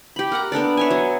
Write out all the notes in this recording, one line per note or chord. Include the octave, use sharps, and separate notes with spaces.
G4 B5
A#4 F#5 A#5
B3 D4 A4 D5
C#5 E5 G#5
F#3